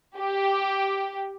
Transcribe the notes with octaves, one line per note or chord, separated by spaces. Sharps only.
G4